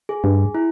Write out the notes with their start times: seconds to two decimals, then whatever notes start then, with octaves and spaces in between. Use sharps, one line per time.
0.09 G#4
0.24 G2
0.55 E4